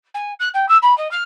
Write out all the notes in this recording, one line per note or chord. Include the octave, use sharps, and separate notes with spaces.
G#5
F#6
G5
E6
B5
D#5
F6